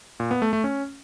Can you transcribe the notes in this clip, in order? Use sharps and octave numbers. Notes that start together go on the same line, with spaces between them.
A#2
B3
A3
A3
C#4